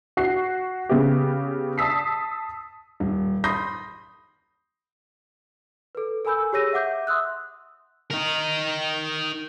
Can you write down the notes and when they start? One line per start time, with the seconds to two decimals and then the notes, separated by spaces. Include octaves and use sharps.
0.17 F#4 C7
0.89 C#3 B3 G4
1.78 A5 D#6 E6 B6 C7
3.00 D#1
3.44 B5 C6 D#6 G6 A#6 C7
5.95 A4 B4
6.25 A4 A#4 G#5 B5 E6 G6
6.53 G4 G#4 C#5 E6 A#6 D#7
6.73 E5 F#5 D6 G6
7.07 E5 C6 D#6 E6 F#6
8.10 D#4 A#4